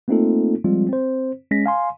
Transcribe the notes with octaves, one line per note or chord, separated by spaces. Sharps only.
A3 A#3 C4 D#4 F4 A4
F3 G3 G#3 C4 F4
C4 C5
G#3 C#4 A#6 B6
F5 G#5 C6